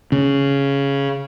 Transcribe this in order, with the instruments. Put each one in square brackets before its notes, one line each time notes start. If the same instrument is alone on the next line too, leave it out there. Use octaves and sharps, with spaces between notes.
[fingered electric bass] C#3